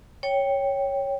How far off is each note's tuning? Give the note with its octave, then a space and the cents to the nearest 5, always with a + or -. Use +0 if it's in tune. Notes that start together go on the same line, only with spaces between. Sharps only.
C#5 +0 G5 +0